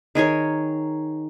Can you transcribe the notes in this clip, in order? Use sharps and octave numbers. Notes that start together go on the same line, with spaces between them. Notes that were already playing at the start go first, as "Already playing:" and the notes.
D#3 G#4 A#4 C#5